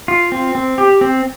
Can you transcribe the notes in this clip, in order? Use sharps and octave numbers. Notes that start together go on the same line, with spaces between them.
F4
C4
C4
G4
C4